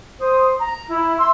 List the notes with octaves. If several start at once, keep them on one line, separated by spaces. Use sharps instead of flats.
C5 D#6
A#5
E4
E5 C6 E6